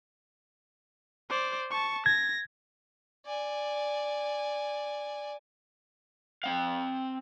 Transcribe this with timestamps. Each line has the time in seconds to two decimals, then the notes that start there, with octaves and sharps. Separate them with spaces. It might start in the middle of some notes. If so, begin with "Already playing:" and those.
1.29 C5 D5
1.70 A5 C#6
2.06 G#6 A#6
3.26 D5 G#5
6.44 C4 F5